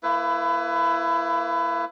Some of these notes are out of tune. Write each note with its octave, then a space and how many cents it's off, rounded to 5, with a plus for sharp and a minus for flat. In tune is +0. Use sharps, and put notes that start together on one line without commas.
A#3 -15 E4 +20 B4 +25